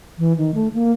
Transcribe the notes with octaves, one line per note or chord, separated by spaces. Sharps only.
E3
D#3
A3
A#3